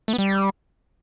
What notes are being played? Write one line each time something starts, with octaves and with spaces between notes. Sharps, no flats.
A3
B3
G3